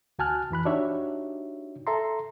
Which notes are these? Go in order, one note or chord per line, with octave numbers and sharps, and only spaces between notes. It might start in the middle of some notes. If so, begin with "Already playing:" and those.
D2 F#4 G#5 A5 F6 F#6
F2 E3 B5 F#6
D4 D#4 F#4 G4 C#5 E5
A4 E5 A#5 C6